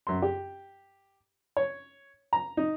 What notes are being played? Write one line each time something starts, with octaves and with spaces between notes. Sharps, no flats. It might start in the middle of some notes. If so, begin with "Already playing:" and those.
F#2 C6
G4
C#5
A#5
D#4